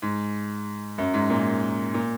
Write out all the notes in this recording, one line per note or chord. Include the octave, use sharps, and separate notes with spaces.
G#2
F#2
G#2
A#2
A#2